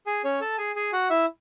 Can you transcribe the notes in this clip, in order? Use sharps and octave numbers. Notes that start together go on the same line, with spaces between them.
G#4 G#5
C#4 C#5
A4 A5
G#4 G#5
G#4 G#5
F#4 F#5
E4 E5